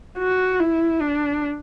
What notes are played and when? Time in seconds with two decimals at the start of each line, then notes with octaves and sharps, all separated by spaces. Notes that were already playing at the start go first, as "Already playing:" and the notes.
0.18 F#4
0.60 E4
1.01 D4